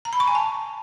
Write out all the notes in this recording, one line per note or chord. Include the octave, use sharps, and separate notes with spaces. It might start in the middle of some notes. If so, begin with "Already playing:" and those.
A#5
B5
C#6
G#5
A5